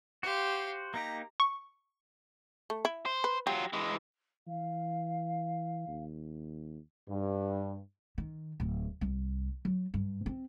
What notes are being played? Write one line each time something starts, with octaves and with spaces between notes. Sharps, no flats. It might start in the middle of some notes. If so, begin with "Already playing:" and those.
F#4 G4 C5 F5
A#3 D#4 G4 A#5
C#6
A3
E4
C5
B4
F#3 F4 G4
E3 G#3
E3 F5
D#2
G2
D#3
D1
C2
F#3
G2
C4